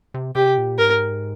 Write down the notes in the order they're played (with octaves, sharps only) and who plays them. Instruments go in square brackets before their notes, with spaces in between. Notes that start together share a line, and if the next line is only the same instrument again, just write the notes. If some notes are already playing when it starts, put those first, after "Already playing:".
[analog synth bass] C3
[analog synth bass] C3 [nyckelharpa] G4
[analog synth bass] A#2
[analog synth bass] G#2 [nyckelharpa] A#4